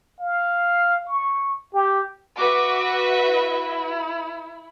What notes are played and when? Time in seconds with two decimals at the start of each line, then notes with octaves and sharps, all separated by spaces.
0.20 F5
1.07 C#6
1.74 G4
2.37 F#4 B4 E5 D6
3.25 E4